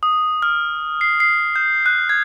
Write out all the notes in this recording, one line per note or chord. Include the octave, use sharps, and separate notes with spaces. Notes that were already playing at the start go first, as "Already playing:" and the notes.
D#6
F6
C7
C7
G6
F#6
G#6